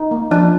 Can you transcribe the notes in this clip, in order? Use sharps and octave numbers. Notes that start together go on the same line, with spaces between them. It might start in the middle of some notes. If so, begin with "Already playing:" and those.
Already playing: D#4
A#3
F3 D4